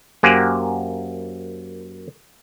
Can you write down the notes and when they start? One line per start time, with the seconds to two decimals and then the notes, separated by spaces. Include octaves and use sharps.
0.23 F#2 A#3 G4 C5 F#5 G#5